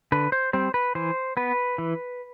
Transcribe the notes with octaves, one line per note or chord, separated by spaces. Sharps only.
D3 B4
C5
G3 C4 C5
B4
E3 C5
B3 B4
E3